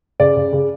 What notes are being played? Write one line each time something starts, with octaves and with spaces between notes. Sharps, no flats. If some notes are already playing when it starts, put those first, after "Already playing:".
C#3 D5
C#3
C#3